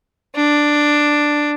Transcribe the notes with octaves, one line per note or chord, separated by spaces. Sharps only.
D4